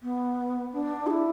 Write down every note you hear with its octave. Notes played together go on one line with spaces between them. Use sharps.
B3
D4
G#4
E4